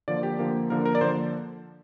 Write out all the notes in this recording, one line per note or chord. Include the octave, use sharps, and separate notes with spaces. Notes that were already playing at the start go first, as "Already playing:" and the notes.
D3 F3 A#3 D5
G4
D3 F3 A#3
D3 F3 A#3 A#4
A#4
D5
D3 F3 A#3 C5